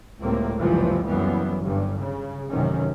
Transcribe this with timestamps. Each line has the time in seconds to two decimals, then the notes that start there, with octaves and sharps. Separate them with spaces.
0.21 C#2 A2 G3 A3 A#3 C4
0.58 F#1 C#2 G2 C3 E3 F3
1.05 F#1 F#2 E3 G3 B3
1.60 G1 G2
1.99 C#3
2.50 A1 F#2 C3 D#3 C#4